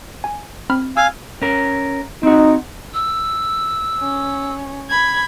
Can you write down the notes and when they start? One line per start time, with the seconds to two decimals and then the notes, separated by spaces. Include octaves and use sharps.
0.24 G#5
0.70 C4 B5 F6
0.97 F5 G#5 E6
1.42 C#4 A#4
2.23 C4 D#4 F#4
2.94 E6
4.00 C#4
4.90 B5 G#6